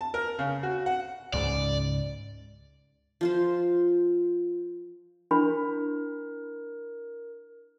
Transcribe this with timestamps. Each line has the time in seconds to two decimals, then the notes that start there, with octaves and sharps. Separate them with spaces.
0.01 A5
0.14 A#4
0.39 C#3
0.63 F#4
0.86 F#5
1.34 C#2 G#2 C#3 D5
3.21 F3 F4 C5
5.31 D4 E4 A#4 B5